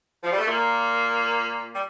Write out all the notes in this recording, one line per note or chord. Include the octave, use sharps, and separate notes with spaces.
F3
G3
A3
A#2 A#3
G3